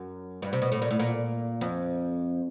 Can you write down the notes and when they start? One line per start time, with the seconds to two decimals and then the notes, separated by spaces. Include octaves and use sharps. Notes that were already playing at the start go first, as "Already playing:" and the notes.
Already playing: F#2
0.42 G2
0.53 C3
0.62 B2
0.72 A2
0.82 A#2
0.91 A2
0.99 A#2
1.61 F2